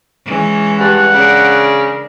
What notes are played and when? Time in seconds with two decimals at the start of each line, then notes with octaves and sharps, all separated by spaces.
0.25 E3 G#3 C#4
0.80 G2 F#5
1.14 C#3 D4 A#4